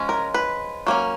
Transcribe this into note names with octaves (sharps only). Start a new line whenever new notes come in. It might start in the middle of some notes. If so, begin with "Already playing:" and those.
Already playing: F3 G#3 C#4
A#4
B4
F#3 A#3 C#4